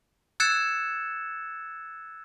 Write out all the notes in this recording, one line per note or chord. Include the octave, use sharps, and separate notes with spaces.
E6 F#6 G#6 A6 C#7 E7